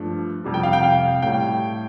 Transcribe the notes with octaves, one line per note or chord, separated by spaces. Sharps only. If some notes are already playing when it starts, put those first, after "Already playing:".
Already playing: G2 F3 A3
F2 C3 G3
G5
F5
G5
F5
A2 G3 G5